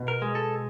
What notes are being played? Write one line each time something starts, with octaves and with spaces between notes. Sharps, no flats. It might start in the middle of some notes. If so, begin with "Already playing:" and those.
Already playing: B2
A#4
G#3
A4